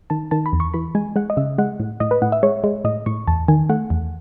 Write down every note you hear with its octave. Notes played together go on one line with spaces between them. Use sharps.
D#3 A5
D#3 A5
B5
E2
C#6
E3 B5
G#3 G#5
G#3 F#5
D#5
C#3 E5
G#3 F#5
A2
A2 D#5
B4
A2 F#5
E5
G#3 C#5
G#3
A2 D#5
A2 C#6
E2 A5
D#3 G#5
A3 F#5
E2